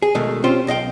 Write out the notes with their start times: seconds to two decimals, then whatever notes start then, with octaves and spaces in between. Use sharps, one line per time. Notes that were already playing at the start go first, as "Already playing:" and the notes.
0.02 G#4
0.15 B2 D#3 G#3 A3
0.44 C4 C#4 F4 G4 C5 C6
0.67 B1 D#5 F5 G5